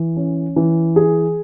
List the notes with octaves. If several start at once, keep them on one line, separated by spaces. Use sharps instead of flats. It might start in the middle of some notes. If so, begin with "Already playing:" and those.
Already playing: E3
C#4
E3
G#4